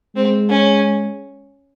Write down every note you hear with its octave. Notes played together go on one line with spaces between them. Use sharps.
G#3 C4
C#4